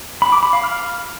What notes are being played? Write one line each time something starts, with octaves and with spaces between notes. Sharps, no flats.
B5
D6
B5
F5
F6